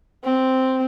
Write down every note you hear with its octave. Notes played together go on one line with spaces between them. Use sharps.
C4